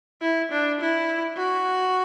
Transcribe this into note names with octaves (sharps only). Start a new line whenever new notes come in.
E4
D4
E4
F#4